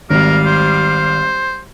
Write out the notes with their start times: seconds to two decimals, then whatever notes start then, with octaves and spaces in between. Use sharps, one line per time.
0.10 G#1 G3 A#4 F5
0.46 C5